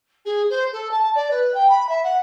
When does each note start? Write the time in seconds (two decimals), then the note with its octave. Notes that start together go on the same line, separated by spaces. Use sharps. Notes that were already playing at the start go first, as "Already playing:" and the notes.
0.25 G#4
0.50 C5
0.72 A4
0.91 A5
1.15 D5
1.30 B4
1.54 G5
1.69 B5
1.89 E5
2.03 F#5